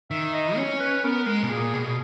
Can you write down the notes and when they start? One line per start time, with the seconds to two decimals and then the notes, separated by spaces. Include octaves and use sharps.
0.11 D#3 E5
0.33 D#5
0.57 C#4 C#5
0.80 B4
1.04 B3 A#4
1.26 G#3 A#4
1.43 B2
1.49 A#2 G#4
1.73 B2 G#4
1.86 G#4